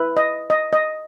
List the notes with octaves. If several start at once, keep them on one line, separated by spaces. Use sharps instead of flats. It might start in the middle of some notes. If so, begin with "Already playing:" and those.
Already playing: E4 B4
D#5
D#5
D#5